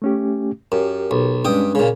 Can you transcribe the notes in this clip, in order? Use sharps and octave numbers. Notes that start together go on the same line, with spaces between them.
A3 C#4 G4
F#2 G4 A#4
B1
G2 G#3 C#4 D4 G5 D#6
A#2 C#3